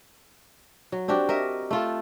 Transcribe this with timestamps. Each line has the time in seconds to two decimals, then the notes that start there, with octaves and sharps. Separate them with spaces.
0.92 F#3
1.08 C4 D4 F#4 G4
1.29 A#4 D#5 E5
1.71 A3 F4 A4